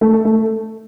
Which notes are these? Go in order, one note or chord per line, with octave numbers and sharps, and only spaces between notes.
A3
A4
A3